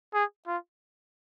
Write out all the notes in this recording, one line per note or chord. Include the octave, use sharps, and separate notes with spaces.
G#4
F4